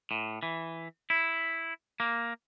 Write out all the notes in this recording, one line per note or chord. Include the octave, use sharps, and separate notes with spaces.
A2
E3
E4
A#3